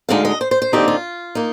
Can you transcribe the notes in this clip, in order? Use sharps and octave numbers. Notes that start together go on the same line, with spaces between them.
D2 D3 G#3 D#4 F5
D#5
C5
C5
C5
D#2 D3 F3 C4 D#4 G4
F4
A#3 D#4